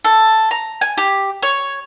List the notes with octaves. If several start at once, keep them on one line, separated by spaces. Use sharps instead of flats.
A4
A#5
G#5
G4
C#5